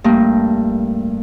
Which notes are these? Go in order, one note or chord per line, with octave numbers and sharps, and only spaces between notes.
G2 A3 A#3